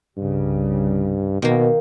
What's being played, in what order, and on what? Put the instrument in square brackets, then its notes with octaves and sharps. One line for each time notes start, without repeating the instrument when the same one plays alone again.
[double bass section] C2 C#3 G3 [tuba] G2
[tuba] B2 [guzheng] D#3 A#3